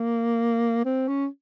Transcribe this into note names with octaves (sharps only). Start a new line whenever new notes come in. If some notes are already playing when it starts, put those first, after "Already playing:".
Already playing: A#3
C4
C#4